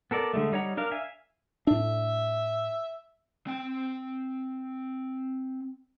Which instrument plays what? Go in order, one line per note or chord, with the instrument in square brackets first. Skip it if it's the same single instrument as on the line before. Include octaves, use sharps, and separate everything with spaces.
[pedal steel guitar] B3 A4 A#4 D5
D3 G#3 A3
G3 D#4 C#5 F#5 A#5
D4 A#4 F5
E5 F5 G#5
[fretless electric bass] A2 D4 [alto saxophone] E5
[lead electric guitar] C4 G5